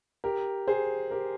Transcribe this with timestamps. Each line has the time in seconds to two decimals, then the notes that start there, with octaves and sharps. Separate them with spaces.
0.24 G4 A#4
0.68 G#4 C5
1.11 G4 A#4